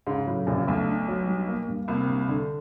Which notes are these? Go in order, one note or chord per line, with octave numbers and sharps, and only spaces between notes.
G#2 C#3
A2 F#3
A#1 A#2 C#3
B1 B2 A3
D4
F#3
G3
A#3
G2
C2 C3 A#3
G2
D3